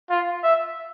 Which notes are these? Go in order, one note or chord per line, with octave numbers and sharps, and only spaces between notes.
F4
E5